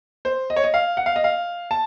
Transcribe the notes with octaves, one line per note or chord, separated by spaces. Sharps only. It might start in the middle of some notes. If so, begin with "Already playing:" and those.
C5
D#5
C#5
D#5
F5
F#5
F5
D#5
F5
A5